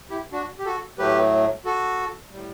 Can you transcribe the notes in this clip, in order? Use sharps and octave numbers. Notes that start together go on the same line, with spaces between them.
E4 G4
D4 F#4
G4
F#4 A4
A2 F#3 A3 G4 B4
F#4 A4
A2 G3